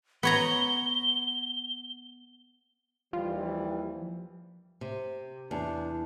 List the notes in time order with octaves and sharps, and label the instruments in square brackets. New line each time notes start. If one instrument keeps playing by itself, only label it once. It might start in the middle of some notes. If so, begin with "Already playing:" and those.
[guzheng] B3 C#5 A#5 [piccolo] G7
[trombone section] D#2 E3 G3 [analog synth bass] F3
[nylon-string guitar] C3
[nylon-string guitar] E2 [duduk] D4